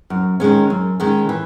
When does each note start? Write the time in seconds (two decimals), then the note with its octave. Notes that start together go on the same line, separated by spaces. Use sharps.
0.10 F#2
0.40 D#3 G#3 C#4
0.70 F#2
1.00 D#3 G#3 C#4
1.29 E3